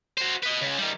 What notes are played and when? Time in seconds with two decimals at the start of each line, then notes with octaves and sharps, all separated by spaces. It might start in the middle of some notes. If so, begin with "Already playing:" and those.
0.18 F#4 C5
0.43 B4 D#5
0.61 C#3 G#3
0.78 D#3 G3